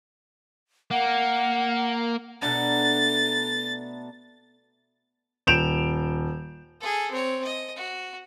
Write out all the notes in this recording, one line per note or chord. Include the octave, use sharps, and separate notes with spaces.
A#3 F#5
B2 A3 B3 D4 A#5 A6
D#1 G6 D7 E7 F7
G#4 A4
C4 C#5
D#5
F#4